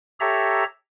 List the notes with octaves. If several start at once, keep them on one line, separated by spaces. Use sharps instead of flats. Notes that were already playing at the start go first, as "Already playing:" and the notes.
G4 A4 C#5 E5 A#5